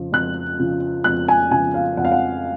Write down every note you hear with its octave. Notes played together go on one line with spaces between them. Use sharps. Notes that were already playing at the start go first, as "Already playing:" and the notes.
Already playing: F2 C#3 F3
F2 F#6
C#3 F3
F2 F#6
G#5
C#3 F3 G#5
F5
F2 F#5
F5
F#5